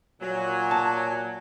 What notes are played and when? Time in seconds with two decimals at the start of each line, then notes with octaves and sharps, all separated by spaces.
0.21 A#2 F#3 G#5
0.71 A5